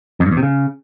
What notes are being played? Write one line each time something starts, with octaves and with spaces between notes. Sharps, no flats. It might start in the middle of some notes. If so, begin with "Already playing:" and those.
F2
G2
E2
C3
C#3